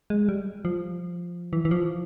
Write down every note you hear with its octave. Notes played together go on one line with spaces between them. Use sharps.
G#3
G3
F3
E3
E3
F3